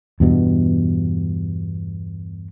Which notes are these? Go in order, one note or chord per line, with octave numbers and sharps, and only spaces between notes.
E2 G2 B2